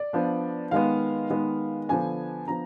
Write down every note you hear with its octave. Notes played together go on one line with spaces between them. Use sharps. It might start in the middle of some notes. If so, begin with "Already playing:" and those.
Already playing: D5
F3 B3 D4
D#3 G#3 B3 F5
D#3 G#3 B3
D3 F3 B3 D4 G#5
F3 B3 D4 A#5